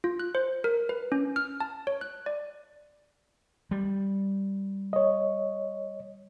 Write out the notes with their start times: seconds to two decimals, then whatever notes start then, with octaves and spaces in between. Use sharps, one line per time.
0.04 F4
0.20 F#6
0.35 C5
0.64 A#4
0.89 B4
1.12 C#4
1.36 F6
1.60 A5
1.87 C#5
2.01 F#6
2.26 D5
3.71 G3
4.93 C#5 D#5